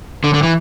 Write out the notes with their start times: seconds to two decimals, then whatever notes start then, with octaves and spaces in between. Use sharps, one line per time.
0.24 D3
0.34 D3
0.43 E3